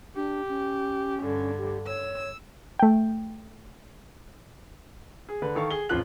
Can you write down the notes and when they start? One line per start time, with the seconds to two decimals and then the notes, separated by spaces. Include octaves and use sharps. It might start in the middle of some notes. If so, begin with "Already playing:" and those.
0.16 D4 G4
0.49 C#4
1.21 G2 D3
1.58 G4
1.87 C#5 E6
2.79 A3 G5
5.29 G#4
5.42 D3 B4
5.55 D#3 A4 F5 C#6
5.71 G#4 G7
5.89 A1 F2 F3 F4 F#6 F#7